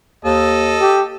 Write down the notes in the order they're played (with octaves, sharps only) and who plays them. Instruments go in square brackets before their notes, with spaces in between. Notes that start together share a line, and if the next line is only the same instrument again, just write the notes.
[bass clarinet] D#2 [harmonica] A4 D#5
[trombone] G4